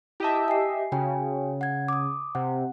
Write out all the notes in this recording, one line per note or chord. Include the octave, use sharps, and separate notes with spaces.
E4 G4 D#5 E5 A5
G#5 C7
C#3 F#4 G5 G#5
F#5 G#6
D6 D#6
C3 F#5